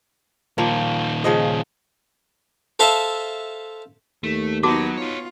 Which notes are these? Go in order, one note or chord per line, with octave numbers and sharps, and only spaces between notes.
A#2 D#3 F3 A#3
C#3 F3 D#5
A4 C5 E5 F5 A5
D#2 A3
F#3 B3 D#4 F#4 A5 D6
D#4 F4 C#5